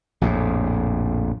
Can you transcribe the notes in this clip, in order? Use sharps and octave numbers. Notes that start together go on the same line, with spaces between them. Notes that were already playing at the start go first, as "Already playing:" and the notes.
A#1 F2 A2